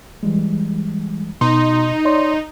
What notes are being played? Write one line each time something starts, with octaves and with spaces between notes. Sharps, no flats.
E3 G3 G#3
B2 D#4 C6
C#5 D5 C6